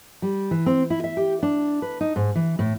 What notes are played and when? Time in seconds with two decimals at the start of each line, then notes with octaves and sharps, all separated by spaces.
0.22 G3
0.51 E3
0.66 C4
0.90 E4
1.04 E5
1.17 G4
1.43 D4
1.82 B4
2.01 D#4
2.16 G#2
2.35 E3
2.59 A2